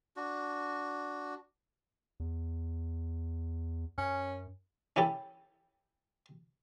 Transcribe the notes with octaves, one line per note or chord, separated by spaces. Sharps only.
D4 F#4
E2
F#2 C#4
C#4 E4 G4 A4